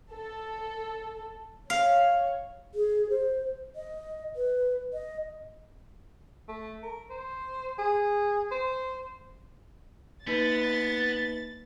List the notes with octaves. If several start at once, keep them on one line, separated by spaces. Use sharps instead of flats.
A4
C#5 F5
G#4
C5
D#5
B4
D#5
A3
A#4
C5
G#4
C5
A#3 B3 D#4 B4 A6